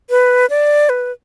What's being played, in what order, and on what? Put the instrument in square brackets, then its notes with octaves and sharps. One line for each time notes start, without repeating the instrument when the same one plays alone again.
[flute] B4
D5
B4